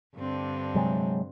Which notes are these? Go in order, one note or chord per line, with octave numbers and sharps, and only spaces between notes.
G2 D3 C4
C3 F#3 G#3